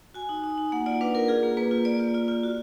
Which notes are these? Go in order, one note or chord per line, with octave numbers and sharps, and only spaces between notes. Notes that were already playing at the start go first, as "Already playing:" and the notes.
F#4 G#5
D#4
D#4
D#4
A#3 F#5
F4 D5
D4 B4
F4 A#4
F4 G#4
A#3
A#3 B4
F4
A#3 D5
F4
F4
F4
F#4